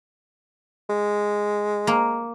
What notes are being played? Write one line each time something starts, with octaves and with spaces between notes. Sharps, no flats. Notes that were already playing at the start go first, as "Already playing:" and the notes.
G#3
A#3